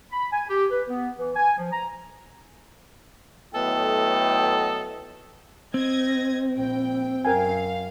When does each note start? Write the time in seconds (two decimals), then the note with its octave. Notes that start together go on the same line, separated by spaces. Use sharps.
0.12 B5
0.33 G#5
0.49 G4
0.71 B4
0.89 B3
1.18 E3
1.36 G#5
1.58 F3
1.73 A#5
3.54 A2 F#3 B3 A4 D#5 G5
5.74 C4 D#5 G#6 A#6
6.57 A#1 G5
7.25 F#2 A#4 F5 G5 G#5